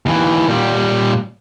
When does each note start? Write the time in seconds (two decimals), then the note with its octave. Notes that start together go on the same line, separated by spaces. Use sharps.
0.06 D#2 E3
0.48 A#2 G3